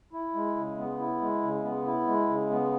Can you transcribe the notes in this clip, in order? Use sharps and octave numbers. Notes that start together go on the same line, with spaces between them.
E4
G#3
C#3
B3
E4
G#3
C#3
B3
E4
G#3
C#3
B3